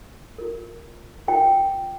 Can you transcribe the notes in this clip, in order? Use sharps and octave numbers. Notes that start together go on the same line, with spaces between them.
F4 A#4
F4 A#4 G5